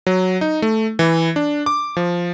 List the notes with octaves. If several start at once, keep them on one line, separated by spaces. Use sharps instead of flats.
F#3
D#4
A3
E3
D4
D6
F3